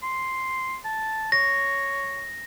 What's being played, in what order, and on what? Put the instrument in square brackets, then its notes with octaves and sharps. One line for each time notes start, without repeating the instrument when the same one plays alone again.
[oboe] C6
A5
[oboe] C#5 [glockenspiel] A#6